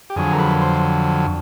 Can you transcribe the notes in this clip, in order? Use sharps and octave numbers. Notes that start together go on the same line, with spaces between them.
G4
F2 D3 F#3 G#4
A#4
B4
C5